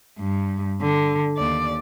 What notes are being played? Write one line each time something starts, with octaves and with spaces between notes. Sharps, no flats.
G2
D3
D#2 D5